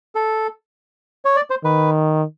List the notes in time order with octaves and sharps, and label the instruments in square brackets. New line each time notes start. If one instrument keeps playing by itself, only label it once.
[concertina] A4
C#5
D5
C5
[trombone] D#3 [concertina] B4